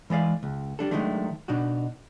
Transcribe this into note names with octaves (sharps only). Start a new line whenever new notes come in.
E3 G#3 D5 F5
C#2
G3 D4 A4
D#3 E3 F#3 G#3 A3 D4
B2 D4 D#4 F#4